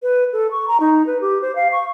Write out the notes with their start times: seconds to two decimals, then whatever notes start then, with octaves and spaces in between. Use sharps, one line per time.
0.03 B4
0.33 A4
0.51 C#6
0.68 A#5
0.80 D#4
1.07 B4
1.21 G4
1.42 C5
1.56 F5
1.72 C#6